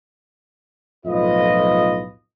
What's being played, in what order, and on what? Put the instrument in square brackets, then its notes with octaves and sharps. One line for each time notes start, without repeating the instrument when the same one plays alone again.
[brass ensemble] B1 F2 A2 F4 B4 D#5